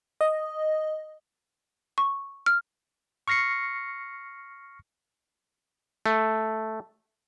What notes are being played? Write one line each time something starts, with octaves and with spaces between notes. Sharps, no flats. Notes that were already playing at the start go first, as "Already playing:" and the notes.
D#5
C#6
F6
C#6 F6 A#6 C7 C#7
A3